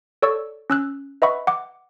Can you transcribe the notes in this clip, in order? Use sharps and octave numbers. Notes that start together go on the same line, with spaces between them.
A4 C#5 D5 C#6 E6
C#4 E6 F#6
B4 D#5 E5 F#5 B5 C#6
F#5 D6